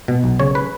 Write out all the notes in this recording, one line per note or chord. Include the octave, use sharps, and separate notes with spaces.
B2
B1
C#3 C#5
B4